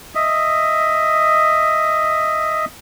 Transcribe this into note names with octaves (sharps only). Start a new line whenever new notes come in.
D#5 E5